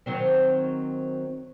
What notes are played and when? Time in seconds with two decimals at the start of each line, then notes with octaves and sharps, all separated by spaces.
0.06 D#3 F#3 C4